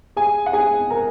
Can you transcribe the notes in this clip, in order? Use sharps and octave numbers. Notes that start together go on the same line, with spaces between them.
G#4 G#5
F#5
G#4 G#5
A#4 A#5